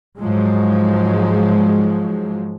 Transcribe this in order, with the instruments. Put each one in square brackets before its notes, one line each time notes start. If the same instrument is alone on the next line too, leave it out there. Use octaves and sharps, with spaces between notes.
[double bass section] G#2 F3 F#3 G#3